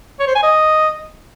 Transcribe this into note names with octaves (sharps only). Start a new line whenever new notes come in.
C#5
C5
G#5
D#5